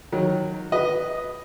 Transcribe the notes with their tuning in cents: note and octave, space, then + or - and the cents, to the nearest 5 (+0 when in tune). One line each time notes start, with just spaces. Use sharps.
D#3 +0 F#3 -15
B4 +0 D#5 +0